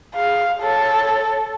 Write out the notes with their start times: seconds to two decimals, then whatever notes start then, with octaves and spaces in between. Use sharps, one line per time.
0.15 G#4 F5
0.62 A4 C#5